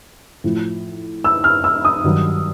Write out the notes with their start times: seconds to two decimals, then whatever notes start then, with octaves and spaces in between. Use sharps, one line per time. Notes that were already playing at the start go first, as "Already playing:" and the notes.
0.44 A2 F3
1.24 E6
1.44 F6
1.64 E6
1.85 D#6
2.04 G2 D#3 F#3